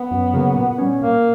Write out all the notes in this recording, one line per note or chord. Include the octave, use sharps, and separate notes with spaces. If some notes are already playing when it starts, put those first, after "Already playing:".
Already playing: B3
F#2
C#3 F#3 A#3
A#2
G3 C#4
A#2 A#3